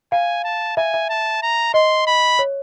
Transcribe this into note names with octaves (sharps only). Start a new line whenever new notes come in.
F5 G#5
A5
E5 G#5
E5
A5
A#5
D#5 C6
B5
C#5